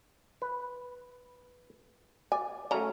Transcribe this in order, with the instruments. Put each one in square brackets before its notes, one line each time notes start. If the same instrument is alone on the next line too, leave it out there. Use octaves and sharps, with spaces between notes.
[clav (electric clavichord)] B4
[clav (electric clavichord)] D5 [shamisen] G#5
[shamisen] C#3 F#3 A#5 [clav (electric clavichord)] A3 C#4